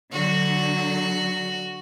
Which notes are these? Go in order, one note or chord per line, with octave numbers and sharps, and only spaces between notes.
D3 F#3 F#4